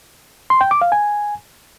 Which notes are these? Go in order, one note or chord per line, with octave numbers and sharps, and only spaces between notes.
C6
G5
D6
F5
G#5